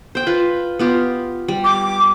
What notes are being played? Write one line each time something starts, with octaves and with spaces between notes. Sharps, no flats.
C5 G5
F4 B4
B3 F4 G4
G3
D6